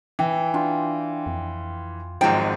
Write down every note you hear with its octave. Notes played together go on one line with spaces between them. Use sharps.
E3 G5
D4 F4
F2
G#1 G#2 F3 F#3 D#4 G5